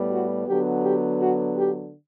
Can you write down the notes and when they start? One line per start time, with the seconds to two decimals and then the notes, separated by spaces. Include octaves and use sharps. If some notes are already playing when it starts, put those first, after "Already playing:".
Already playing: A2 G3 B3
0.10 F#4
0.46 D3 F#3 B3 G4
0.83 G4
1.19 F#4
1.57 G4